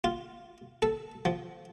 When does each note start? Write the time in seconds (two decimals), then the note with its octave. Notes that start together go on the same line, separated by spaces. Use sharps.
0.04 F4
0.82 A4
1.25 F3